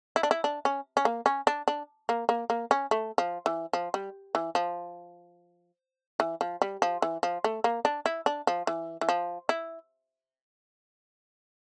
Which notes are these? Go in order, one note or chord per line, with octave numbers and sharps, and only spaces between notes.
E4
D4
E4
D4
C#4
C#4
A#3
C#4
D4
D4
A#3
A#3
A#3
C#4
A3
F3
E3
F3
G3
E3
F3
E3
F3
G3
F3
E3
F3
A3
A#3
D4
E4
D4
F3
E3
E3
F3
E4